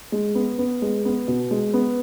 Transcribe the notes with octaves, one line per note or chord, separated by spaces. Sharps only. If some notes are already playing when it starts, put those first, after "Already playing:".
G#3
B3
B3
G#3
B3
B2
G#3
B3